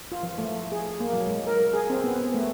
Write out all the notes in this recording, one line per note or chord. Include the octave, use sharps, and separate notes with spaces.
F4
F3
A3
G#4
A#3
F#3
G#3
A#4
G#4
C4
B3
A3